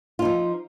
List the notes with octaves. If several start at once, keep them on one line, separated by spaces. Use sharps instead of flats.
F3 D#4 F4